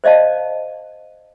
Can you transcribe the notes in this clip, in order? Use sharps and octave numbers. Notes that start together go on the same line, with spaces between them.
C5 D5 D#5 F5 A5